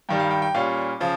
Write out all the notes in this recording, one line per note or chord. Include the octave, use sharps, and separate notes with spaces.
G2 D#3 G3 G5
F5
G5
G5
A#2 G3 C#4 F5
C#3 F3